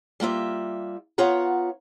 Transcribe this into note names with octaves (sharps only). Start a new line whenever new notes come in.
G3 A#3 F4 E5
B3 F4 C#5 F#5 A#5